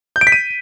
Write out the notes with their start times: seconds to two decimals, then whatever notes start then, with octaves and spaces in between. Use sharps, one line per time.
0.16 G6
0.21 D7
0.27 B6
0.32 D#7